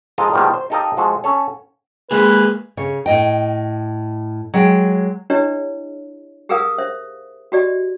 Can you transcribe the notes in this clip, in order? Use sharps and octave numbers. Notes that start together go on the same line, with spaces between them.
F3 G#3 A4 A#4 D#5 F5
B2 D#3 F3 G3 G#3 A#3
C5
D#4 G4 A4 A#4 D#5 F5
F3 G#3 F#4 G#4 A4
C#4 A4 C#5
G#3 A#3 G#4 B4
C#3 C#5
A2 C4 D#5 G5
F#3 G#3 G5
D4 E4 G4 B4 C#5 D#5
G4 G#4 A#4 B4 F5 D#6
C5 E5
F#4 G4 D5 D#5